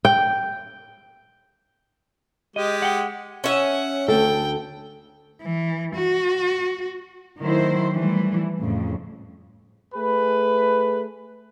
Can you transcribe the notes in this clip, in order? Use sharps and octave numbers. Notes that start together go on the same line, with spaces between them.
G5
G#3 G4 D#5
F#5 G5
C#4 E5 F#5
D2 A4 G5
E3
F#4
D#3 F#3 A3 E4 C5
E3 G3 A3
F2 A2 C#3
A3 G#4 B4